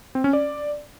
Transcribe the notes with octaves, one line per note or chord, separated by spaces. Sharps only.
C4
C#4
D5